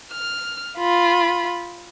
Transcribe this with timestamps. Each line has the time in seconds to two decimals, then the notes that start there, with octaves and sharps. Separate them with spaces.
0.12 F6
0.78 F4 B5